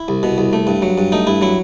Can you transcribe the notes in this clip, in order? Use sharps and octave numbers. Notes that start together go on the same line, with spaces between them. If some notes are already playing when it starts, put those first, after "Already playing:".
Already playing: E4
C2
B2
C2
A3
G2
F#3
G2
A3 D#4
G2 E4
F#3 E4